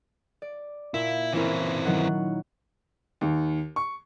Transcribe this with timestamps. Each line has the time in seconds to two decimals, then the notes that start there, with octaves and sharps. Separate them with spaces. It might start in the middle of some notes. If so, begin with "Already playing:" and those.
0.42 D5
0.94 A#2 E4
1.34 E3 C4 C#4 E4 A#4
1.85 D#3 F#3 F#5
3.21 D#2
3.76 C#6